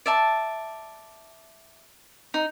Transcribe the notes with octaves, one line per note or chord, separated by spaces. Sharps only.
D5 E5 A5
D#4